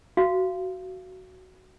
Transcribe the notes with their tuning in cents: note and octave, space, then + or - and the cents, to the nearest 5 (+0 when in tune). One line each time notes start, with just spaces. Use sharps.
F#4 +5 F5 -25